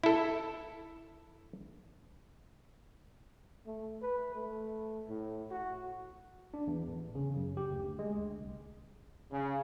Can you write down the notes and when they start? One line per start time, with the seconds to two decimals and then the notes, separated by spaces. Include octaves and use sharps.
0.04 E4 A4
3.66 A3
4.02 B4
4.35 A3
5.09 A2
5.51 F#4
6.54 D4
6.67 E2
6.88 A1
7.15 C#3
7.36 F#2
7.57 G4
7.71 D2
7.99 G#3
8.14 D2
8.41 C2
9.32 C#3